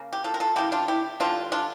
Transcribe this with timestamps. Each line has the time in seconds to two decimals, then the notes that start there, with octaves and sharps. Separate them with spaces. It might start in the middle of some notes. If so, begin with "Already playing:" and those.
Already playing: C#3 A#3
0.13 G4
0.24 F4 A4
0.34 A#4
0.40 F4 A4
0.56 C#3 G3 A#3 E4 G4
0.72 D4 F4
0.88 E4 G4
1.20 D3 G3 A#3 D4 F4
1.52 D4 F4